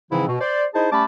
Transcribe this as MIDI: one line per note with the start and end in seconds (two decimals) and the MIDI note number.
0.11 0.25 44
0.11 0.25 49
0.11 0.25 52
0.11 0.25 53
0.11 0.25 60
0.11 0.25 64
0.28 0.36 47
0.41 0.64 72
0.41 0.64 74
0.74 0.87 63
0.74 0.87 64
0.74 0.87 68
0.74 0.87 72
0.74 0.87 75
0.74 0.87 81
0.92 1.04 55
0.92 1.04 57
0.92 1.04 61
0.92 1.04 81
0.92 1.04 83
0.92 1.04 86